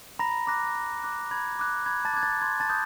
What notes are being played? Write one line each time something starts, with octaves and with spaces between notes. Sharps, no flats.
A#5 B5 A#6
A#5 D6 F#6 A#6
B5
D6 F#6
B5 G#6
D6 F#6
B5 G#6
A5 A6
D6 F#6 G#6
A5 A6
C6 G#6
A5 A6
D#6 G6